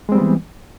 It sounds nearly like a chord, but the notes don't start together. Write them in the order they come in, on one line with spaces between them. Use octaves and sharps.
G#3 C4 G3 B3 E3